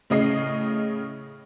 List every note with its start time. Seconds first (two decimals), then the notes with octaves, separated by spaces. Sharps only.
0.10 A2 C#3 D#5 C7